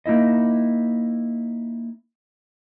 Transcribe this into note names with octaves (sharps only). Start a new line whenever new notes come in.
A#3 D#4 E4 D#5